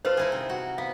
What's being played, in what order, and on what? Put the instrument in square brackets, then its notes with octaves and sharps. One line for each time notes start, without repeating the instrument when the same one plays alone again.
[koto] F4 A4 [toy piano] B4 C5
[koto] D#4 E4 G#4
C3
F#4
[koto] B3 [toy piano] F5